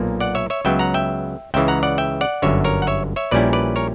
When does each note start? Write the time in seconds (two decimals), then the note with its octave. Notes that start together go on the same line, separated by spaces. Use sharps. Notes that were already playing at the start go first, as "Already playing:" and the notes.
Already playing: B1 A#2 A#3
0.21 D5 F#5
0.35 C#5 E5
0.50 C#5 E5
0.65 C#2 C#3 F#3 B3 E5 G5
0.79 F#5 A#5
0.94 E5 G5
1.54 C#2 C#3 E3 E5 G5
1.68 F#5 A#5
1.83 D5 F#5
1.98 E5 G5
2.21 D5 F#5
2.42 G1 F#2 D3 C#5 E5
2.64 A#4 C#5
2.82 F#5
2.87 C#5 E5
3.16 C#5 E5
3.31 A#1 A#2 G3 C#4 E4 B4 D5
3.53 B4 D5
3.76 A#4 C#5